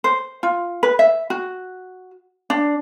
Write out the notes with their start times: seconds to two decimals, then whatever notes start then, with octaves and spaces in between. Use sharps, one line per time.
0.04 C5
0.43 F4
0.83 B4
0.99 E5
1.30 F#4
2.50 D4